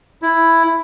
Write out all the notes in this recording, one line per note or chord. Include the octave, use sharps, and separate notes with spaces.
E4